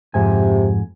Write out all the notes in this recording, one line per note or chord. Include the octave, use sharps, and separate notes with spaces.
F2 G#2 C3 G#5